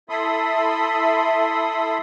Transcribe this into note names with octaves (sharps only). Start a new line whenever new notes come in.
E4 A4 E5 B5 C6 D#6